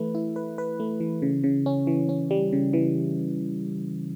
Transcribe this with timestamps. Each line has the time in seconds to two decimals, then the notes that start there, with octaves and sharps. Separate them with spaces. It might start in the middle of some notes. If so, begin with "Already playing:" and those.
Already playing: E3 A3 B4
0.15 E4
0.36 B4
0.58 B4
0.80 A3
1.00 E3
1.22 C#3
1.44 C#3
1.66 C#4
1.87 E3
2.09 C#4
2.31 G3
2.53 C#3
2.73 E3